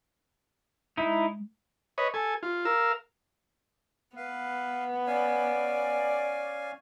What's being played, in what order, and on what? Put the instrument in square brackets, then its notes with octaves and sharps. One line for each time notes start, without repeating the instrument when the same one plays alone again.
[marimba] G#3 [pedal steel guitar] D#4 E4
[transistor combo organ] B4 C#5 D#5
A4 G#5
F4
A#4 F5 E6
[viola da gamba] B3 [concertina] B4 F5
[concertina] C#4 F5 G#5 [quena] D5